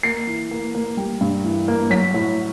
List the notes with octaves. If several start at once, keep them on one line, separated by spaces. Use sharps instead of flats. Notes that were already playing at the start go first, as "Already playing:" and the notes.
A#3 C7
E3
A#3
A#3
G3
G2
E3
A#3
F#3 B6
A2